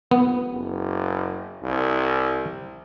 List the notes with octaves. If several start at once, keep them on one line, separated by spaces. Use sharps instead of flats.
F1 B3
F#1
C2